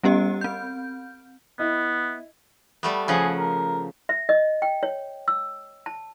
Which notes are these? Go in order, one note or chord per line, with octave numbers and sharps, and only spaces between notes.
G3 B3 C#4 G4 D#5
C4 G6
B3 E4 D#5
G3 A3 B3
C#3 F3 G#4 F#5
A#4
E5
D#5
G5
C#5
E6
A5